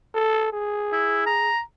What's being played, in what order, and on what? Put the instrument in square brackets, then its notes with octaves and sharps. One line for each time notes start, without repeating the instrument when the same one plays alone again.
[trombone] A4
G#4
[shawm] E4
A#5